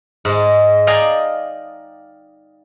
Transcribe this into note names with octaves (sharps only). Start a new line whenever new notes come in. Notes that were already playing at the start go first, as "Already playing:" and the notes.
G#2 G#3
D5 D#5 F5 G5 G#5 A#5